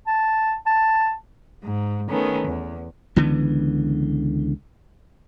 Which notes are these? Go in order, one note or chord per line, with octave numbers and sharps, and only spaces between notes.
A5
A5
G#2
D#3 A3 B3 C#4
E2
C#2 D3 E3 B3